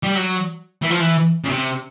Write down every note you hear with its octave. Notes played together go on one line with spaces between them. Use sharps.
G3
F#3
E3
F3
E3
C#3
C3